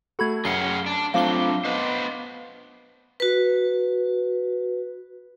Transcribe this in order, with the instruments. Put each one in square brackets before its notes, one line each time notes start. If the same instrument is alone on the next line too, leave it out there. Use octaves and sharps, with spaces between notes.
[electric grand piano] A3 F#4 [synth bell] A4 B5 G#6
[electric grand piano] F#2 [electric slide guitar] G#4 F5 F#5 [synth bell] G7
[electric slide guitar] D4
[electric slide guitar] F#3 D4 [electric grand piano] A3 C4 F4 [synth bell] F5 D6 G7
[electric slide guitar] B3 B4 C5 [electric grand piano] D#5
[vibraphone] F#4 B4